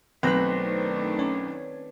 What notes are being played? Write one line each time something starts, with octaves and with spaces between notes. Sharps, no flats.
B1 D#3 A3 C4 D4 B4 C5 A#6
C#4